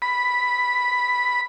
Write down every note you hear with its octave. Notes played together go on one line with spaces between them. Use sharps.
B5